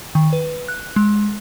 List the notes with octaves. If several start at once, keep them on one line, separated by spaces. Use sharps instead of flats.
D#3
B4
F#6
G#3